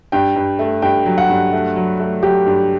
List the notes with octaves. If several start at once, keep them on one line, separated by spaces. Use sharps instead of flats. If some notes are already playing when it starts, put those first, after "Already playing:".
G2 G5
G2
A3
G2 G5
F#3
F#5
G2
A3
F#3
A3
F#3 G4
G2